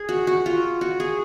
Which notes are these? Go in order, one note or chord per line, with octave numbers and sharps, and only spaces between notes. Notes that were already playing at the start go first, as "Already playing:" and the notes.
Already playing: G#4
F#4
F#4
F4
F#4
G#4